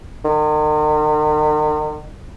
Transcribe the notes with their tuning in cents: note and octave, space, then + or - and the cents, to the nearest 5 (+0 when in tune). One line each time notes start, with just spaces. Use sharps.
D#3 -40